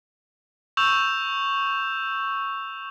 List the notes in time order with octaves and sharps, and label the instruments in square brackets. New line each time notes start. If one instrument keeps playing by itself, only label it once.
[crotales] C#6 E6 G6 E7 F7